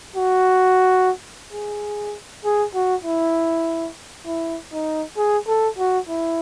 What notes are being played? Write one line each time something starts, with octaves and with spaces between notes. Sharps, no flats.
F#4
G#4
G#4
F#4
E4
E4
D#4
G#4
A4
F#4
E4